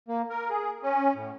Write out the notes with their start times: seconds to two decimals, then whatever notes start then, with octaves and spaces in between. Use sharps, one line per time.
0.08 A#3
0.30 A#4
0.50 G#4
0.83 C#4
1.15 A2